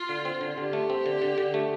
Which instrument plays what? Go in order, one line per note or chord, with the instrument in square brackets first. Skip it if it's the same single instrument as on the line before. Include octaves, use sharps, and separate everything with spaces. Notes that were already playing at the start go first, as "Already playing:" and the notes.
Already playing: [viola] F4
[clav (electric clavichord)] D3
C4
D3
[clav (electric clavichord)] D3 [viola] G4
[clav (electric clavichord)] A3
C4
D3
D3
D3
A3